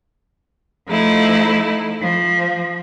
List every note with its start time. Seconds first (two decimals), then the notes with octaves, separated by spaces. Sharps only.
0.88 F3 A3 D#4 E4
2.01 F3